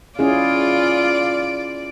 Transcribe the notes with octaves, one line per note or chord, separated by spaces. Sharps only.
C#4 E4 F4 G#4 D5